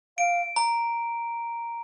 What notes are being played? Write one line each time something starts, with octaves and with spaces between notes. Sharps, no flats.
F5 D7
A#5